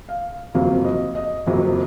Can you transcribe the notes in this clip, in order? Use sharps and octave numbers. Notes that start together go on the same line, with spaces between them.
F5
F#1 F2 C3 F#3 F5
D#5
D#5
F#1 F2 C3 F#3